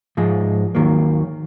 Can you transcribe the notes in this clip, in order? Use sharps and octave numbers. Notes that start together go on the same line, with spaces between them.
G#2 F3 G#3
D#2 D#3 F#3 A#3